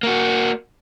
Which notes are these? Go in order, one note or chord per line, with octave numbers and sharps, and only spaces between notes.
A#3 F#4